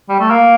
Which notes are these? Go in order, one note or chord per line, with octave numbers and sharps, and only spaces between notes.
G3
A3
A#3